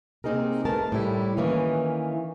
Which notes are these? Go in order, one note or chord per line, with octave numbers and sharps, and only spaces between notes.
C3 A#3 C4 D#4 G#4 A#4
A3 G#4 A#4 B4 A5
A2 C3 G3 E4
D#3 E3 A#3 C#4